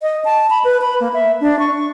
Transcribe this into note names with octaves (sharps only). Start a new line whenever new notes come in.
D#5
A5
B5
B4
B5
A#3
E5
D4
C#6